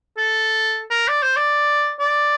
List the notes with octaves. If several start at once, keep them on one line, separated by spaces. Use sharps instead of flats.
A4
A#4
D5
C5
D5
D5